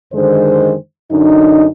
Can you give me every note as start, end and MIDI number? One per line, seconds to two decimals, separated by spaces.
0.13 0.75 42
0.13 0.75 50
0.13 0.75 51
0.13 0.75 56
0.13 0.75 72
1.11 1.66 42
1.11 1.66 50
1.11 1.66 62
1.11 1.66 63